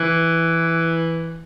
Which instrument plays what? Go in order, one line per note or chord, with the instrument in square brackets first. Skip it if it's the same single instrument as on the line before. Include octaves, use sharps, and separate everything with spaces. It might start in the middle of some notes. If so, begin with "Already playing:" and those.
Already playing: [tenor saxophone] E3